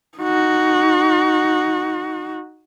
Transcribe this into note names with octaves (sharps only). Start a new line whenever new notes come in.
D#4 F#4